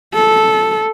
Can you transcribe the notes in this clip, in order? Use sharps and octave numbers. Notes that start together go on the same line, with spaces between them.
A4